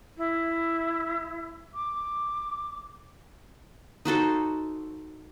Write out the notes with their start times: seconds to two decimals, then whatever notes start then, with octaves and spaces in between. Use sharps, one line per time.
0.17 E4
1.74 D6
4.05 D#4 F#4 A4 C5